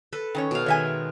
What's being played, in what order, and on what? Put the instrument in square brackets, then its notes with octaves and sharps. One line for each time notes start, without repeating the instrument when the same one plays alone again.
[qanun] A4 B4
[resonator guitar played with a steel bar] D#3 C#4 C#5
[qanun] B2 F5
[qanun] D#3 G#3 [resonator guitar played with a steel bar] C#5 E5 G#5